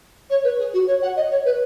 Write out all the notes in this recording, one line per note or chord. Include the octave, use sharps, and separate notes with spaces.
C#5
B4
G#4
F#4
C#5
F#5
D#5
C#5
B4